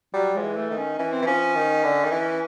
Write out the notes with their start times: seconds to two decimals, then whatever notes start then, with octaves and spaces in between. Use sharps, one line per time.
0.13 F#3 G3
0.35 F3 G#3
0.42 E3
0.56 A3
0.71 D#3
0.77 C#4
0.98 E3 C#4
1.12 C4
1.22 E3
1.26 F3 C#4
1.55 D#3
1.84 D3
2.04 D#3
2.11 E3